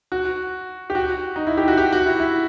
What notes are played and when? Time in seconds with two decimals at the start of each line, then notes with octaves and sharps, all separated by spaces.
0.12 F#4
0.90 G4
0.95 F#4
1.36 D#4
1.47 E4
1.58 G4
1.68 F#4
1.77 G4
1.93 F#4
2.06 E4
2.20 E4